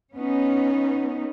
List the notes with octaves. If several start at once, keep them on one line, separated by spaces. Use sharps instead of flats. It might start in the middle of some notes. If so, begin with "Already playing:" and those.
B3 C#4 D#4